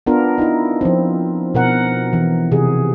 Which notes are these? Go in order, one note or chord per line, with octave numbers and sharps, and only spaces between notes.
B3 D4 F4 A#4
D#4 E4
F3 C4
B2 A#4 F#5
E3
C3 G#4